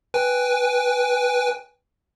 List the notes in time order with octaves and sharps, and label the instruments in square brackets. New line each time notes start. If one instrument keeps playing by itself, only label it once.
[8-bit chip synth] B4 G5 G#5